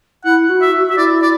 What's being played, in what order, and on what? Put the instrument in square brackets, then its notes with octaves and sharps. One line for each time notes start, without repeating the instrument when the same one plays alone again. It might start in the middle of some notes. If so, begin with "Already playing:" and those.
[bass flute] E4 [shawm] F#5
[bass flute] F#4
[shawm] E5
[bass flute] F#4
[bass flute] F#4 [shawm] E5
[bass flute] E4 [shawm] D5
[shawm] D5